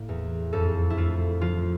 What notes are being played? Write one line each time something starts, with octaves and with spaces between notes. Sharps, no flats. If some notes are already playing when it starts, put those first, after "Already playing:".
Already playing: A2 A#3
E2
F2 A4
E4
A3 F4
F3 F4